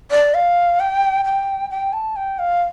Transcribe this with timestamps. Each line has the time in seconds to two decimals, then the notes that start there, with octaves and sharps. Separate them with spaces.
0.11 D5
0.34 F5
0.80 G5
1.25 G5
1.70 G5
1.93 A5
2.16 G5
2.39 F5